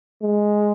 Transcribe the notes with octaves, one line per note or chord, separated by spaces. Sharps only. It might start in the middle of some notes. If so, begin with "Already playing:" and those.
G#3